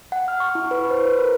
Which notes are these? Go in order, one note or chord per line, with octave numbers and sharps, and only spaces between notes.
F#5
F6
C#6
E4
B4
C5
B4
A#4